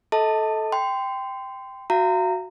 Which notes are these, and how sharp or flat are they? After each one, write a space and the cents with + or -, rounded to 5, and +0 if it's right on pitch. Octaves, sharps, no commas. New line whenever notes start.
A4 -10 D#5 +35 A5 +15
G5 +0 C6 -25
F#4 +0 F5 -45 A#5 -20